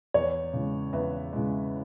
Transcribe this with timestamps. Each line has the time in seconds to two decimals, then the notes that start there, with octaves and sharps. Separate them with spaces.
0.14 E2 C#5
0.53 C#3 E3 G#3
0.93 E2 B4 E5
1.33 C#3 E3 G#3